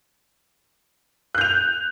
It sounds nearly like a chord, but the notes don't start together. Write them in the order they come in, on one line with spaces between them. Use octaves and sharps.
F#6 G6 F7